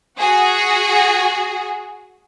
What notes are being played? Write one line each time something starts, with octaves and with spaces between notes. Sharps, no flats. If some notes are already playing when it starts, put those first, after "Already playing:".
F#4 G#4